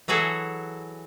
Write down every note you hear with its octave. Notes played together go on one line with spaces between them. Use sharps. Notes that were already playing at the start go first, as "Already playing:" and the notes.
E3 F#3 F#4 G#4 A4